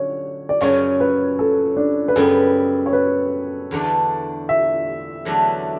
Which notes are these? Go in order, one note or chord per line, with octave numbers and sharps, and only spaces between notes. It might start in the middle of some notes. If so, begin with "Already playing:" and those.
Already playing: D3 F#3 C#4 C#5
D5
F#2 C#3 F#3 C#4 C#5
B4
A4
D4
B4
F#2 C#3 G3 B3 A4
C#5
B4
E2 D3 A3 D4
E5
E2 D3 F#3 A3 D4